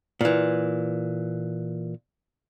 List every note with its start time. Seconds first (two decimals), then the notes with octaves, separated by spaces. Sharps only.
0.21 A#2 E3